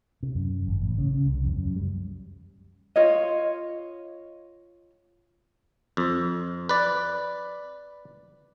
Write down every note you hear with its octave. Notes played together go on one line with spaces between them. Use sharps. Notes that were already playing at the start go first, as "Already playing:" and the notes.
C3
F#2
G#1
A1
C#3
C#3
C2
F2
F#2
G3
F4 C#5 D#5
F2
B4 D5